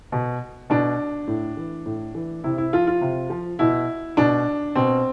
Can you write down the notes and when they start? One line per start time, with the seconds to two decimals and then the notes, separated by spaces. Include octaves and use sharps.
0.12 B2
0.70 B2 D4
1.27 A2
1.57 E3
1.86 A2
2.15 E3
2.44 C3 E4
2.58 E4
2.73 F3 F4
2.87 F4
3.01 C3
3.30 F3
3.59 B2 E4
4.17 B2 D4
4.75 B2 C4